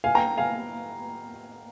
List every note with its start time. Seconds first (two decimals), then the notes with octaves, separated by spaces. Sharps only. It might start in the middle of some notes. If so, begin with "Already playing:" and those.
0.04 F5 G#5
0.15 G5 A#5
0.37 F5 G#5